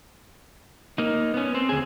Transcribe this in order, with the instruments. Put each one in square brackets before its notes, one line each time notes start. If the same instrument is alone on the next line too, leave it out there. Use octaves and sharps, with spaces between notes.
[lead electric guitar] A#3 D#4
B3 C#4
C4
D2 G#4